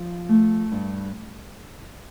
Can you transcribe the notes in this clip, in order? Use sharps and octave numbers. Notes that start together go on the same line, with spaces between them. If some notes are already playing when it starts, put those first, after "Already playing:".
Already playing: F3
A3
G2